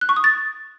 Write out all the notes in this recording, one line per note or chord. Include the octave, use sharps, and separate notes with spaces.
F#6
C#6
D#6
A6